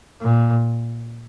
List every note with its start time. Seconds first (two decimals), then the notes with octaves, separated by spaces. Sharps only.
0.21 A#2